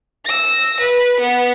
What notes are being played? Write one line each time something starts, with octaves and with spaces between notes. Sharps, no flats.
E6 A#6
B4
B3